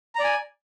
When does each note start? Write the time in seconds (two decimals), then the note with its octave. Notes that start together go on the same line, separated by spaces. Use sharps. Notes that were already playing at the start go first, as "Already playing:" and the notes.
0.15 A#5
0.20 D5
0.24 G#5